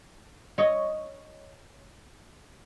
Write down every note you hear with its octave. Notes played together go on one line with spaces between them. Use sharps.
C#5 D#5